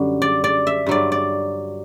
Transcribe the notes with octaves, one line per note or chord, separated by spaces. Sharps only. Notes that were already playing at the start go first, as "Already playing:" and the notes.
Already playing: F#2 D3 G3 F#4
D5
D5
E5
G2 F#3 D5
D5